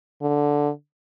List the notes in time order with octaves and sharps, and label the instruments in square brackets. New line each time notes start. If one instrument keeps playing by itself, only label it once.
[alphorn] D3